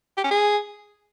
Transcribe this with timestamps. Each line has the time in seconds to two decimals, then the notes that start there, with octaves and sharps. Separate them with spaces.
0.17 G4
0.24 C#4
0.31 G#4